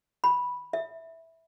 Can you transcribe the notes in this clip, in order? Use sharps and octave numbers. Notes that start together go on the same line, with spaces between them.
B5
E5